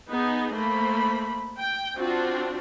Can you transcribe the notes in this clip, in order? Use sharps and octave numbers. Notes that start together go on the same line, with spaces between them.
B3 D#4 G#4
A3 A#3 C5 B5
G5
C4 D4 F4 F#4